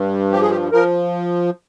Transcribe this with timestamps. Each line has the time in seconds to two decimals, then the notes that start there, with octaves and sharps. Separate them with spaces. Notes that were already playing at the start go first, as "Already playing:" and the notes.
Already playing: G2
0.31 F3 G4
0.41 G#4
0.50 G4
0.72 F3 A#4